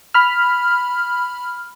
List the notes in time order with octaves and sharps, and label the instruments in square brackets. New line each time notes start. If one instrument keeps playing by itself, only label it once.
[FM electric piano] B5 F6